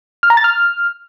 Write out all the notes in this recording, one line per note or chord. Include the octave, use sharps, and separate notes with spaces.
F6
A#5
A6
F6